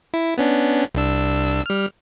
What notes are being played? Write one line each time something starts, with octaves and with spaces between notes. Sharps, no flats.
E4
B3 C#4 D4
C2 D4 E6
G3 F6